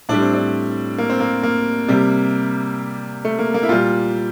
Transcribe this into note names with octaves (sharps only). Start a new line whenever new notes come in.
A2 G3 D4
C4
D4
A#3
C4
A#3
A#3
C3 G3
A3
A#3
A#3
E4
A#2 G3 F4